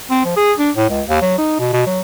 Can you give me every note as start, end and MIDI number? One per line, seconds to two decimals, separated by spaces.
0.10 0.23 60
0.25 0.35 53
0.36 0.53 68
0.58 0.71 62
0.76 0.88 45
0.90 1.02 37
1.08 1.21 39
1.22 1.37 54
1.38 1.55 63
1.59 1.73 47
1.73 1.82 47
1.87 2.01 54